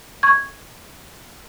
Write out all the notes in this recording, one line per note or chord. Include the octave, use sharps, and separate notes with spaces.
C#6 G#6